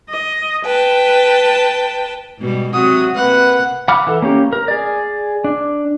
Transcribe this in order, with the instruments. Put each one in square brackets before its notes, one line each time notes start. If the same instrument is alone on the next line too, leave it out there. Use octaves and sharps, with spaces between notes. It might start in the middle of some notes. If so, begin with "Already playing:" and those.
[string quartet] D#5
B4 G5 A5
[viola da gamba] G#2 B2 G3
[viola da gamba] C3 F#3 [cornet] F#4 [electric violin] D#6
[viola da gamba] C3 A#3 [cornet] B4 [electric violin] F#5
[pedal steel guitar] F#5 B5 D6 F6
E3 A4
A#3 C#4 G4
A#4
G#4 D5
D4